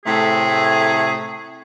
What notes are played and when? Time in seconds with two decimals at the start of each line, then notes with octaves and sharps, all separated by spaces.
0.05 A2 C3 A3 G#4